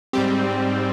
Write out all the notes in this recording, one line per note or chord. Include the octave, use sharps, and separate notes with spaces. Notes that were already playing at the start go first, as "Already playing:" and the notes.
G#2 G3 C4 G4